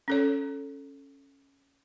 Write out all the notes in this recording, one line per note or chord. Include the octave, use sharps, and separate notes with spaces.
C#4 A4 C#5